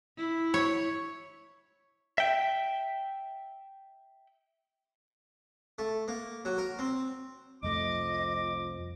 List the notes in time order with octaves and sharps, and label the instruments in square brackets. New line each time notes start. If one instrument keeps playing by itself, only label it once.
[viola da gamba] E4
[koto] C#5
[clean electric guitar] E5 G5
[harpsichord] A3
A#3
F#3
A#4
C4
[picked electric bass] C2 F2 A3 [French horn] F3 [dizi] D#5 [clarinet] D6